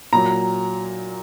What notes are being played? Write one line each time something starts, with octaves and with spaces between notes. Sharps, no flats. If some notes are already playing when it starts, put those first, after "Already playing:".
A#2 F#3 A#5